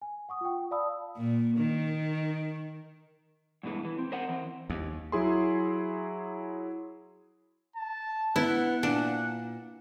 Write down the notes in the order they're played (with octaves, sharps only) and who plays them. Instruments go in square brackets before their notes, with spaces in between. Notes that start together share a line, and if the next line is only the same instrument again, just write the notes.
[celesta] G#5
F#5 C#6 D#6
F4 G5
D5 F5 A5 B5 D#6 E6
[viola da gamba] A#2
D#3
[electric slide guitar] G2 B2 E3 G#3 A3
E3
C4
A#4 C5 D#5 F#5
E3 C4
[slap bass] D#2
[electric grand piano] F#3 E4 G#4 C6
[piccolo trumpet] A5
[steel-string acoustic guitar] B3 [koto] E4 [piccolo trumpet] F#5
[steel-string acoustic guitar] A#2 [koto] D4